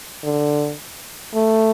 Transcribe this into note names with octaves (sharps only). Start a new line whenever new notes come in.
D3
A3